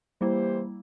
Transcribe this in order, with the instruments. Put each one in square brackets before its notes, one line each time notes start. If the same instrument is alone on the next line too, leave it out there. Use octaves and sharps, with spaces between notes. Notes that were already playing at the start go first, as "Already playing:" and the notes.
[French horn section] E3 G4 C5 [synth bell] G3 A#3 E4